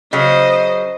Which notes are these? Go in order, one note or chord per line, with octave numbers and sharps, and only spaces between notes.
C#3 F#3 C5 D#5